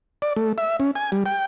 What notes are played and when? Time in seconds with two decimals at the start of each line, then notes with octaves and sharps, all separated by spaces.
0.22 D5
0.36 A3
0.58 E5
0.80 C#4
0.95 G#5
1.12 G3
1.26 G5